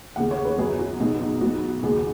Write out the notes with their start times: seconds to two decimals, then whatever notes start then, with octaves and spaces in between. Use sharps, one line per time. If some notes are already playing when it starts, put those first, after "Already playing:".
0.16 D#2 C#3 B3 F#5
0.31 C#5
0.45 B4
0.58 F#2 F#3 B3 G#4
0.79 F#4
1.00 B1 B2 G#3 B3 D#4
1.21 D#4
1.41 B1 B2 B3 F#4
1.83 D#2 C#3 G#3 B3 G#4